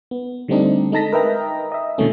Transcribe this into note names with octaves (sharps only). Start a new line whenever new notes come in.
B3
D3 G3 A3 C4 D4 D#4
G#3 D#4 A4 A5 A#6 B6
A#4 B4 D#5 E5 G5 A#5
D#5 E5
B2 D3 E3 G#3 A3 C#4